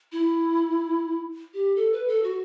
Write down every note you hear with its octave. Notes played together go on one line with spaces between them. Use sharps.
E4
G4
A4
B4
A4
F#4